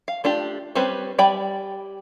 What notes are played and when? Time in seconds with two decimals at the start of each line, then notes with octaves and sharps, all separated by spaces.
0.08 F5
0.24 A3 D4 F4 G4
0.75 G3 C4 C#4 B4 C5
1.18 G3 D5 G5 G#5 B5